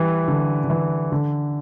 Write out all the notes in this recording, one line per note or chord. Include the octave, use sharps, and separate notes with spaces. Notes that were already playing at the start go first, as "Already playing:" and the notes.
Already playing: E3 G3
D3
D3
E3
D3